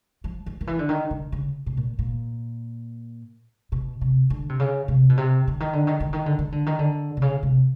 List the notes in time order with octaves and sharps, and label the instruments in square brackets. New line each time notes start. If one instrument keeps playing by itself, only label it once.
[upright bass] F3
F3
D#3
E3
D3
D#3
D3
C#3
B2
A#2
A#2
B2
C3
D3
C3
C#3
C3
B2
C3
D3
D#3
D3
D#3
D3
D#3
D3
D#3
D3
D#3
D3
C3
C#3
C3